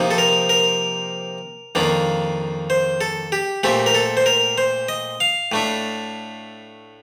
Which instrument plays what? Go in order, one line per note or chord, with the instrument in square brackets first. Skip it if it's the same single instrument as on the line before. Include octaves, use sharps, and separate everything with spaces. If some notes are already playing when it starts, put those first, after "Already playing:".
Already playing: [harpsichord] C3 F3 A#3 D#4
A4
A#4
A#4
F2 D#3 A#3 D4
C5
A4
G4
A#2 A3 C4 G4
A#4
A4
C5
A#4
C5
D#5
F5
A2 A3 D4